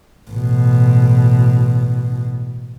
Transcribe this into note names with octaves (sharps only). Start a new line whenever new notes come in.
A1 B2